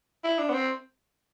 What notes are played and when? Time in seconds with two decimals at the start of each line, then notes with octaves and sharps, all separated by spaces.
0.24 E4
0.39 D4
0.50 B3
0.54 C4